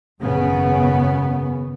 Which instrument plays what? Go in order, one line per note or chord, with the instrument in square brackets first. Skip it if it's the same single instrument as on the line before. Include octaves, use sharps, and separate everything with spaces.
[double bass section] G#1 F#2 C#3 B3 C#4